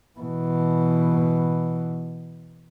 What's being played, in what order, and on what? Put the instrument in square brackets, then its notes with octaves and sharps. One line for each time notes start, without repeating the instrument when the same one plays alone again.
[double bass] B2 E3